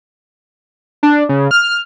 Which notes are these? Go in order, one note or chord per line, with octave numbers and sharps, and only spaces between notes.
D4
C#3
F6